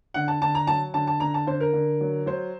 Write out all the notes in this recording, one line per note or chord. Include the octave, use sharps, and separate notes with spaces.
D3 F#5
A5
D3 A5
A#5
F#3 A5
D3 A5
A5
D3 A#5
A5
D3 C5
A#4
D3
F#3
F#3 C5